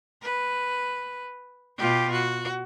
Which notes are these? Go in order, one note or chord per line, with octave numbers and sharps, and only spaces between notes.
B4
B2 F4 G4
F#4